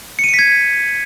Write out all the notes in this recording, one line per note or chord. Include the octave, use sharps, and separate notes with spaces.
C#7
D#7
C#7
B6
G#6